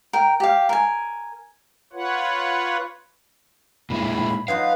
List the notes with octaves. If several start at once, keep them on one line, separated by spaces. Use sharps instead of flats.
A#4 G5
G4 F5
A#4 G#5
F4 B4 C#5 F#5
A#2 G#3 E4 B5
F#3 D#4 F4 B4 F5